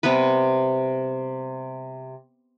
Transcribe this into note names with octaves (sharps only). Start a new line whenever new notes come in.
C3 G3 B3 B4